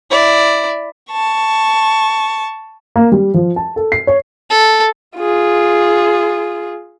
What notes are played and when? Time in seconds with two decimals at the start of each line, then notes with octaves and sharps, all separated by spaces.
0.10 E4 D5
1.12 A5 C#6
2.96 A#3
3.12 G3
3.34 F3
3.56 A5
3.76 A4
3.92 C7
4.07 C#5
4.50 A4
5.17 F4 G#4